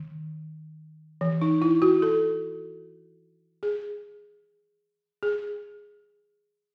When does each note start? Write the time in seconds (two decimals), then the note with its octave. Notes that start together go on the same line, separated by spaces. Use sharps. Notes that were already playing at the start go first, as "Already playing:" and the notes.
Already playing: D#3
1.21 E3
1.42 D#4
1.62 E4
1.82 F#4
2.02 A4
3.63 G#4
5.23 G#4